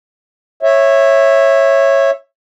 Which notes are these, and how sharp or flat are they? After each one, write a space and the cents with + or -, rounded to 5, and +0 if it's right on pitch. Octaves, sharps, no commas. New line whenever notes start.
C#5 -15 E5 +0